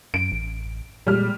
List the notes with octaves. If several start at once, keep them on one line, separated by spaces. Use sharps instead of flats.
F#2 D7
A1
A#2 G3 G#3 F6